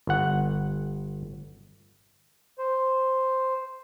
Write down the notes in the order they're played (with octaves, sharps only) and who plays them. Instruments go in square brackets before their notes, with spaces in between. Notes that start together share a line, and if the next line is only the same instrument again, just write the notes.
[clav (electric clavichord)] G1 F#5
[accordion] C5